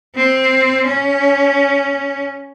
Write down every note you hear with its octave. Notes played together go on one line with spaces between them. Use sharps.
C4
C#4